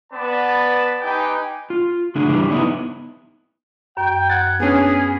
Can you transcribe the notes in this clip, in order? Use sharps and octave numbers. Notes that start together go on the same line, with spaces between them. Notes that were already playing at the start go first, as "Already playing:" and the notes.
B3 B4 D5 A5 B5
D#4 G4 B4 G5 G#5
F4
C#3 A3 D4 G#4
C#3 E3 G3 D4
B3 D#4 E4 B4
F#2 G5
F#5 G#6 A6
B3 C#4 D4 G#4